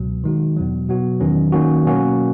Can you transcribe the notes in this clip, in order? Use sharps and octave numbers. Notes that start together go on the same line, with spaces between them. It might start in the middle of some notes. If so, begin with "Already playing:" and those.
Already playing: C#2 B2 F#3
D#3 G#3 D#4 F#4
E2 B2 F#3
B2 F#3 B3 F#4
E2 D#3 F#3 C#4
D#3 A#3 C#4 F#4
B2 F#3 A#3 C#4 F#4